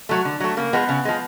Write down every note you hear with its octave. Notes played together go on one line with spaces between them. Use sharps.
F#3 A3
D3
F#3 A3
C#3 A#3
F3 G#3 B3
C#3
F3 G#3